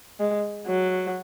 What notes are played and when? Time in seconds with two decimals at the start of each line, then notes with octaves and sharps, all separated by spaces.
0.20 G#3
0.67 F#3